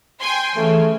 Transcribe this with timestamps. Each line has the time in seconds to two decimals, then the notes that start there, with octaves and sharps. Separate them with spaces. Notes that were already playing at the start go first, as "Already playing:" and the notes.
0.19 G5 G#5 C6
0.56 C#3 E3 A3